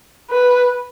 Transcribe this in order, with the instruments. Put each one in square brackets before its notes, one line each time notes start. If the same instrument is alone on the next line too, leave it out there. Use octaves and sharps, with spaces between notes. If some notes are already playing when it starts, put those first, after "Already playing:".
[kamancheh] B4